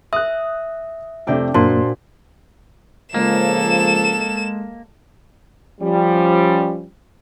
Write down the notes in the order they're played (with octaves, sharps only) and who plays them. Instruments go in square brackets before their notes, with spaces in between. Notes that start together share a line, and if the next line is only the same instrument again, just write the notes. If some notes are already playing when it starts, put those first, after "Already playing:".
[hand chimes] E5 [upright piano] D#6 F#6
[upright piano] F2 C3 A3 [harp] D4 D5 G5
[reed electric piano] F#2 A#3 [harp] A#2 [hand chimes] D4 F#4 C5 [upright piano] A5 C6
[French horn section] C#3 F3 [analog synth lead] G#3 [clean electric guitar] A#3 [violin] A4 E7
[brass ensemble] F3 G3 C#4